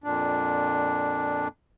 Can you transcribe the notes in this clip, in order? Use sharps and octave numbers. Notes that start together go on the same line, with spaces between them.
F2 A#2 D4